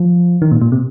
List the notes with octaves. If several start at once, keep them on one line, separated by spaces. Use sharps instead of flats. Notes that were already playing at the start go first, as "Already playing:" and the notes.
Already playing: F3
D#3
A#2
A#2
C3